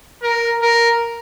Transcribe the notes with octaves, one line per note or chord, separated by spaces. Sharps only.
A#4
A#4